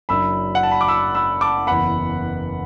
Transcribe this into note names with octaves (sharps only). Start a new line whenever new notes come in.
F#1 F#2 F#3 D4 B5 E6
F#5
A5
B5
D6
B5 E6
B5 E6
A5 D6
F#1 E2 E3 B3 F#5 B5